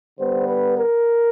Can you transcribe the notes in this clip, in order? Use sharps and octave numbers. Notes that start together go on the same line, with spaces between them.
D3 G3 B3 C5
B4
A#4